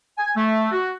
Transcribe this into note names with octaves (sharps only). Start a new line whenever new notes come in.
G#5
A3
F#4